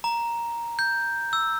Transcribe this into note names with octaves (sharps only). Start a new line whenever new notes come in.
A#5
G6
E6